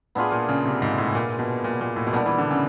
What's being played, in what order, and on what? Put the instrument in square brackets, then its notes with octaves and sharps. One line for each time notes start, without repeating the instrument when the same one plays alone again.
[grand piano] A2 [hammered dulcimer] B3 D4 F4 G#4
[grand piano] A#2
C#3
C3
G#2
A2
A#2
B2
A#2
A#2
A2
B2
[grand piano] A#2 [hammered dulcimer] G3 B3 D4
[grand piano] E3
D3
C#3